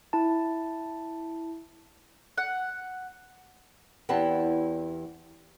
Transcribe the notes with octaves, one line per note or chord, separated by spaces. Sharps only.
E4 A5
F#5
E2 B3 C4 E4 G4 A5